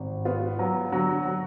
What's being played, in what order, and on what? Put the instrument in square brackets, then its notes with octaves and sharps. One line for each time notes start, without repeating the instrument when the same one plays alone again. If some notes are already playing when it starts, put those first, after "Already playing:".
Already playing: [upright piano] G#1
B3 F4
F#3
D3 F#3 F#4
F#3